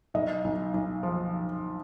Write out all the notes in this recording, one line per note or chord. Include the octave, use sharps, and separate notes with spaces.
B1 D#5
B1
B1
F3